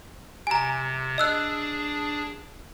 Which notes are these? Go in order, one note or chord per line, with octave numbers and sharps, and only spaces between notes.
C3 G#5 A#5
D4 G#4 D#5 E6 F#6